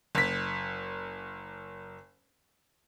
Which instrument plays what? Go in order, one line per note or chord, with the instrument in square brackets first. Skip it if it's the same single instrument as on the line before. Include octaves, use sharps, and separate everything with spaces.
[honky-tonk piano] F#1 B6